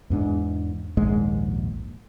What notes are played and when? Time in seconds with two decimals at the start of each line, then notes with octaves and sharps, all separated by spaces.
0.10 E2 G#2 D4
0.97 A#1 D#2 G#2 G#3